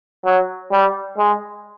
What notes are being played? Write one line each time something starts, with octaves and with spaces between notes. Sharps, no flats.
F#3
G3
G#3